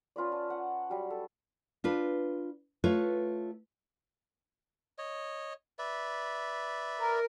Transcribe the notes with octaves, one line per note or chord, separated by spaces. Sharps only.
C#4 F4 B4 D5
A5
F#5
F#3 G3 F#4
A4
D4 F4 B4
A3 F4 B4 C#5
C#5 D#5
B4 D5 E5
A#4